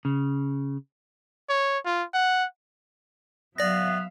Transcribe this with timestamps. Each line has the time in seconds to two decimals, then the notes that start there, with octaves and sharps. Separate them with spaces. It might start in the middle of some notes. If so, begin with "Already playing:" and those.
0.05 C#3
1.49 C#5
1.85 F4
2.14 F#5
3.58 F#3 B3 D5 E5 F5 A#6